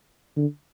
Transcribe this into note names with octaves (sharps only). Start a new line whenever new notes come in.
D3